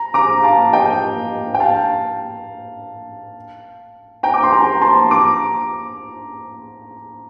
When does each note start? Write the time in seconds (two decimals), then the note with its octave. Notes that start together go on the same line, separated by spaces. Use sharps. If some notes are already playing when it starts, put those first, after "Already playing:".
Already playing: A#5
0.14 A#5 D6
0.43 F5 A5
0.73 D#5 G5
1.54 G5
1.60 F5 A5
4.23 G5 A#5
4.34 D6
4.43 C6
4.52 G5 A#5
4.81 A5 C6
5.11 A#5 D6